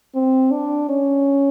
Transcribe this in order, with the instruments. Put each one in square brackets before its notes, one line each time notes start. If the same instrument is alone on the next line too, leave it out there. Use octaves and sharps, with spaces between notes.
[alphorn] C4
D4
C#4